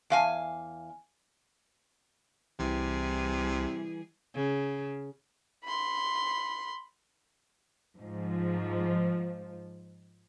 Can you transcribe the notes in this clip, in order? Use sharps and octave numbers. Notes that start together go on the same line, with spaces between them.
E2 F5 G#5
C2 C3 E3 G3 G#4
C#3
B5 C6
G#2 F3